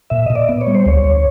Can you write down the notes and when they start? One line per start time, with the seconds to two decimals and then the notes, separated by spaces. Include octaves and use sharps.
0.10 A#2 E5
0.26 A#2 D#5
0.35 D5
0.49 B3
0.61 C#5
0.67 G3
0.75 C5
0.86 D2 C#5
1.04 D2